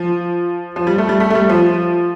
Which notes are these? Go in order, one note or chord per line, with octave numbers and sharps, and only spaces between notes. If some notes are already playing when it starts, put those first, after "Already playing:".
Already playing: F3
F3
G3
A3
G3
A3
A3
G3
F3